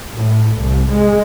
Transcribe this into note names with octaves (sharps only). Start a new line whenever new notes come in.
A2
C2
G#3